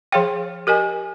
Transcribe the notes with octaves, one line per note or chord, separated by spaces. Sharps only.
F3 G#4 C#5 F5 G5
G4 A#4 D#5 G#5